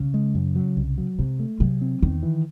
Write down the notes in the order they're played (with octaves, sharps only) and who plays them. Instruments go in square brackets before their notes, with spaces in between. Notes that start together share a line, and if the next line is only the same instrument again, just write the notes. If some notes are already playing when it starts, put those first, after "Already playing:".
Already playing: [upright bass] C#3
[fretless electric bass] G#3
F#2
F#3
C2
F#3
[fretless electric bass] C3 [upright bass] G#3
[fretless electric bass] A3
[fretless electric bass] C3 [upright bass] F#3
[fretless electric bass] C4
[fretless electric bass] E2 [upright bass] D#3
[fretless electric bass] E3